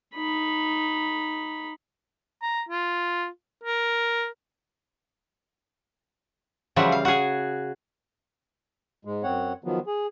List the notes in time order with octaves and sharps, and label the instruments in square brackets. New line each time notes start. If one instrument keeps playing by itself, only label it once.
[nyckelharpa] D#4 B5
[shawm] A#5
F4
A#4
[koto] C#3 E3 F3 G3 F#4 E5
F5
F#4 G#4
[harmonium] G#2 G#3
F#2 C4 C#5 F#5
D#3 F3 F#3 B3
G#4